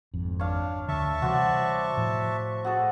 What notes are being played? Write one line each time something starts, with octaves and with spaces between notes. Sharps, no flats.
G#1 F2
D4 C#5 F5
D2 D3 E5 A5 C#6
C3 E3 G3 F#4 C5 D5
A2 F3
F#4 G#4 A4